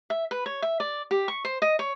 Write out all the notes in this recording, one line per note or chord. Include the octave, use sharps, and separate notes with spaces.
E5
B4
C#5
E5
D5
G4
C#6
C5
D#5
C#5